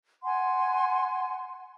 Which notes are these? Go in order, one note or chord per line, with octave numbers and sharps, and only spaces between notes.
F#5 G#5 C6